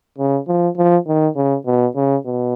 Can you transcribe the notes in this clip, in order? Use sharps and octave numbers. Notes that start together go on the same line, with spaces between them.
C#3
F3
F3
D#3
C#3
B2
C#3
B2